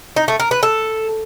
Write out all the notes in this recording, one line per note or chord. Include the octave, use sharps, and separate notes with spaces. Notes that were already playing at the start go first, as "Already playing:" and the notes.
D#4
A3
A#4
B4
A4